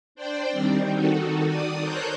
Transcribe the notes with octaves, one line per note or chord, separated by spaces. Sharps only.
D4 C5 D5 G5
D#3 G3 C4
D#3 D#4 F#4 A4
D#3 D5 D#6
A4 A#4 C5 C#5 F#6 G6